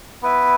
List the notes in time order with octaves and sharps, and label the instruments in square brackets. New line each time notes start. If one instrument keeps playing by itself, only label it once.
[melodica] B3 E4 B4 E5